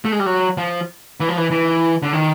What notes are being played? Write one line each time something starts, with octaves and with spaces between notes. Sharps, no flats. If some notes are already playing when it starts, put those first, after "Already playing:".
A3
G#3
G3
F#3
F3
E3
F3
E3
E3
D3
D#3